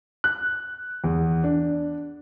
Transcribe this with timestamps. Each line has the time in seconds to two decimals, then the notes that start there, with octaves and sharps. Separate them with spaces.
0.24 F#6
1.04 E2
1.44 D4